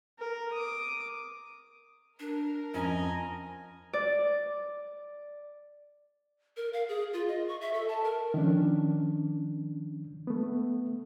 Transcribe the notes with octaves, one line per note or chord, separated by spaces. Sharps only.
A#4
D6 D#6
D4 A#4
F2 C#4 D#5 G#5 A#5
D5
A#4
F5
G#4
F4
D#5
C#6
E5
A4
A5
A#4
D#3 F3 C#4 D4
A3 B3